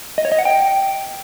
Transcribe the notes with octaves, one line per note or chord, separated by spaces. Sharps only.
D#5
C#5
D#5
F#5
G5